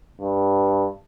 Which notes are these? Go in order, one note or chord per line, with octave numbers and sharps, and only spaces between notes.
G2